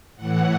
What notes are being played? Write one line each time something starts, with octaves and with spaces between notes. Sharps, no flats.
A2 E3 F#5